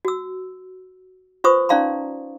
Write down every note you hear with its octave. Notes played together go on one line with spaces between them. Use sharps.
F#4 E6
F4 B4 C5 C#6 D#6
C#4 D#4 D5 F5 A#5 C6